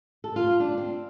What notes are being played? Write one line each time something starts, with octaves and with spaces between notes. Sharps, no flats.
A4
F4
D4
C4